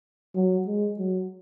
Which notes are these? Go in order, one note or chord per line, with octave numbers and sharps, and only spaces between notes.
F#3
G#3
F#3